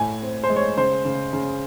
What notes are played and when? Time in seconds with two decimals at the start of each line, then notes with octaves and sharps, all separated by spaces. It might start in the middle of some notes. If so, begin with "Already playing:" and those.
Already playing: A2 G#5
0.22 C4
0.44 C5
0.50 G#3
0.56 C#5
0.77 C#3 C5
1.05 C#3
1.33 C#3